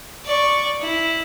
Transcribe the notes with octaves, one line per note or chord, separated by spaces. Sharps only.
D5 C#6
E4